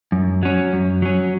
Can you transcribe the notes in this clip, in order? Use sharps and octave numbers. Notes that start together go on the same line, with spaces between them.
F#2
F#3 C#4
F#2
F#3 C#4